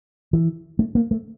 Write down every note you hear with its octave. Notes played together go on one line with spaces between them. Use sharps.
E3
A3
A#3
A3